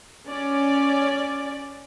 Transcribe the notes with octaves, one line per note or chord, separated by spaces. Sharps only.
C#4 D5